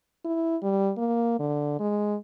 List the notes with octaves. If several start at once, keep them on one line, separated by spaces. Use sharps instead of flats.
E4
G3
A#3
D3
G#3